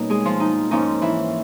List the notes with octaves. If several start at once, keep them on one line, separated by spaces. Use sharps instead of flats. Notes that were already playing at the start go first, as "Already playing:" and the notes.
Already playing: B2 G3 A#3 C#4 D#4 D#5
G#3 G#4
F3 F4
D#4
G#2 F3 A#3 C#4 D#4
E3 E4